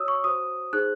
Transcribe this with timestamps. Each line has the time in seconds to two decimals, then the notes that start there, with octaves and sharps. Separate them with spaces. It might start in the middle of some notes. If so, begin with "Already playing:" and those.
Already playing: F#4 C#5 D#6 E6
0.08 C#6
0.24 F#4 C5 D#6
0.73 D#4 G#4 C5 F#6